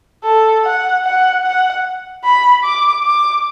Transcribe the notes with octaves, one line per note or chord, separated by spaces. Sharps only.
A4
F#5
F#5
F#5
B5
D6
D6